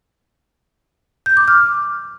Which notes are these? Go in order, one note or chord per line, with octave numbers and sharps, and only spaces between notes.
G6
D6
F6